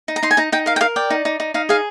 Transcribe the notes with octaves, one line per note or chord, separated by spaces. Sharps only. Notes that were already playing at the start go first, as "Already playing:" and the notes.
D#4
A#5
D#4 C6
G#5
D#4 A#5
D#4 G5
A#4 F5
G5
A#4 F5
D5 G5
D#4
D#4
D#4
D#4 F5
G#4 F5